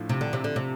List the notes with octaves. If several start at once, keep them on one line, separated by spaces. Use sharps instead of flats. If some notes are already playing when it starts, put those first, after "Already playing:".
Already playing: A2 F3 A3 D4 F4
C3
D3
C3
D3
C3